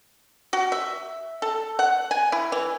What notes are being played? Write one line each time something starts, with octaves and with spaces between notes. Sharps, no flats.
F#4
E5
A4
F#5
G#5
E4
E3